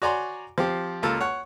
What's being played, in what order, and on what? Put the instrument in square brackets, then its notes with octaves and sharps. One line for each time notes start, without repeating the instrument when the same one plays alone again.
[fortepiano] F#4 C#5 D5 G#5 A#5 C6
F3 C4 G4
C#2 A#3 F4 A4 A5 E6
C#5 F#5